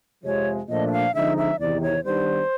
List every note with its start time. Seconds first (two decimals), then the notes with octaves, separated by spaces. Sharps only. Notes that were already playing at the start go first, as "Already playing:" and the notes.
0.24 F2 C3 F3 G#3 C#5
0.69 A#2 F3 A3 D4 D#5
0.87 E5
0.92 F5
1.14 D3 F3 G#3 C4 D#4 E5
1.37 E5
1.59 E2 C3 D#3 D5
1.82 C#5
2.05 D#3 G3 B3 D4 C5